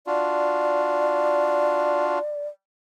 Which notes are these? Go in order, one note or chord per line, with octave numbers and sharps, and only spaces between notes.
D4 F4 F#4 D5